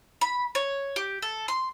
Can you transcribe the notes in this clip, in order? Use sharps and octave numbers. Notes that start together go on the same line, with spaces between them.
B5
C#5
G4
A4
C6